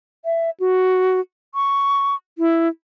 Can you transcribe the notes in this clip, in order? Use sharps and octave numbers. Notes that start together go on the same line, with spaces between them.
E5
F#4
C#6
E4